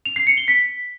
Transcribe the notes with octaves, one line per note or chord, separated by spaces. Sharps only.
F7
C7
C#7
G7
B6